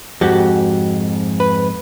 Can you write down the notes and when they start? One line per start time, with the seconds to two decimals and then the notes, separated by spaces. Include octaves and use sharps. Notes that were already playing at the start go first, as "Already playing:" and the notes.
0.21 F2 G#2 F#4 G4
1.40 B4